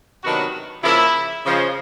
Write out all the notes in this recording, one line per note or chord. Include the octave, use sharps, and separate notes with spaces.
C3 D#3 F#3 B3 D4 F#4
C#3 F3 A#3 E4
C#3 F3 G#3